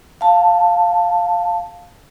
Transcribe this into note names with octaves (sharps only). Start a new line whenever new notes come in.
F5 A5